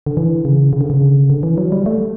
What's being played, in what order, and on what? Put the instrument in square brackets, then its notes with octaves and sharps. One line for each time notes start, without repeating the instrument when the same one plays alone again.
[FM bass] D3
E3
C#3
C#3
D3
C#3
D3
E3
F#3
G3
A3